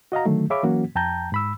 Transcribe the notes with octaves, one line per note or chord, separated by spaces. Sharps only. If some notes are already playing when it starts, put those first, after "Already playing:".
F#4 D#5 F5 A#5
D3 D#3 F#3 A3
G#4 C#5 E5 F5 B5 D6
E3 F#3 A#3 C#4 F#4
F2 G5 A5 A#5 G6
G#2 B5 E6